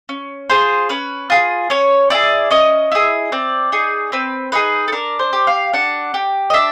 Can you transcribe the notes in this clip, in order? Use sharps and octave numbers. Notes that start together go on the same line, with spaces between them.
C#4
F4 G#4 C5
C#4 B4
F4 G#4
C#4 C#5
E4 G#4 D5
C#4 D#5
E4 G#4
C4 D5
D#4 G#4
C4 B4
D#4 G#4 B4
A4
D4 A#4
C5
G4
F5
D4 F#5
G4
D#5
D4 E5